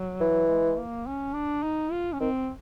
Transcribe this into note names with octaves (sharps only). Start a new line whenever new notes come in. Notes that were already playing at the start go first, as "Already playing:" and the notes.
Already playing: F#3
E3
G#3
A#3
C#4
D4
D#4
F4
C#4
D#3 C4